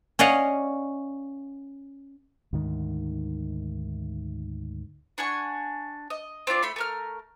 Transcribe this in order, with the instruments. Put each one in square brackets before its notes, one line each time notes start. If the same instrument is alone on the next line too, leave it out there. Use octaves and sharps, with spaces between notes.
[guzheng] C#4 D5 D#5 F5 F#5
[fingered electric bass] D2 G#2 D#3
[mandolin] D4 F#5 G#5 C#6
D#5
C4 D4 F4 D5
A3 B5 C6
A3 A#4 F6